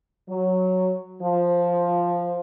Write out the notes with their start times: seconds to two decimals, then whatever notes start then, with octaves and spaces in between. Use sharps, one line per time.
0.29 F#3
1.21 F3